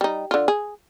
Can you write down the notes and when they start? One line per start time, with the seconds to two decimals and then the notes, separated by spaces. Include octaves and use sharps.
0.01 G3 D#4
0.31 D3 F4
0.48 G#4